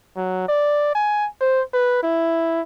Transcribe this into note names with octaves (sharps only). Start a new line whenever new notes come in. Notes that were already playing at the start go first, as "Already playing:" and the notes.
F#3
D5
G#5
C5
B4
E4